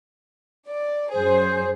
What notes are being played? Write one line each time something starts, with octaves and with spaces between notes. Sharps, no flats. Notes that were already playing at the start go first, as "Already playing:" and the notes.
D5
F#2 G#4 C5